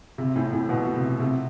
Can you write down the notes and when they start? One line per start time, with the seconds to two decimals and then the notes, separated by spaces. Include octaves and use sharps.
0.18 C3
0.36 A2
0.53 A2
0.69 B2
0.94 C3
1.19 C3